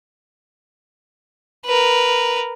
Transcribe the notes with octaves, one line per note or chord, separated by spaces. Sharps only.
A#4 B4